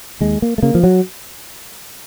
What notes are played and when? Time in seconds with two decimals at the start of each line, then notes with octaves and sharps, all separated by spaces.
0.21 D#2 G#3
0.42 A#3
0.58 A3
0.62 C#3 A#3
0.75 F3
0.83 F#3